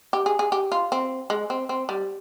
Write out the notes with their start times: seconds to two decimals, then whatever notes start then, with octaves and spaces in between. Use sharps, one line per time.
0.13 G4
0.26 G#4
0.39 G#4
0.52 G4
0.72 F4
0.92 C4
1.30 G#3
1.50 C4
1.69 C4
1.89 G3